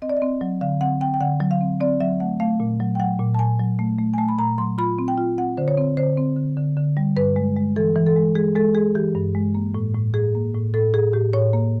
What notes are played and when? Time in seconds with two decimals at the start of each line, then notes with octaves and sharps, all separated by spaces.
0.02 C4 D#5
0.09 D5
0.17 D#5
0.22 C4
0.41 F#3
0.61 D3 F5
0.81 C4 F#5
1.01 C4 G5
1.14 G5
1.21 D3 F#5
1.40 F#3
1.51 F5
1.61 C4
1.80 C4 D5
2.00 F#3 E5
2.20 A3 F#5
2.40 A3 F5
2.60 A#2
2.80 F#3
2.95 G5
3.00 F#3 F#5
3.19 A#2
3.35 A5
3.39 A#2 G#5
3.59 F#3
3.79 A3
3.98 A3
4.14 G#5
4.18 A3 A5
4.29 B5
4.39 A#2 A#5
4.58 F#3 C6
4.78 F4 B5
4.99 C4
5.08 G5
5.18 F4
5.38 C4 F#5
5.57 D3 C5
5.68 C#5
5.77 C4
5.97 D3 C5
6.17 C4
6.37 D3
6.57 D3
6.76 D3
6.97 G3
7.16 G2 B4
7.36 G#3
7.57 G#3
7.76 E3 A4
7.96 E3
8.06 A4
8.16 G#3
8.35 G#3 G#4
8.55 G#3 A4
8.75 G#3 G#4
8.95 E3 G4
9.15 G2
9.35 G#3
9.55 A#3
9.74 A2
9.94 A2
10.14 A2 G#4
10.35 A#3
10.54 A2
10.74 A2 A4
10.94 A2 G#4
11.13 A2 G4
11.33 A2 C#5
11.53 A#3